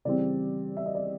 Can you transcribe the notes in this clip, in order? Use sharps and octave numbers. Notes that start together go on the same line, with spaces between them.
C#3 E3 G3 C4 D5
E5
D#5
D5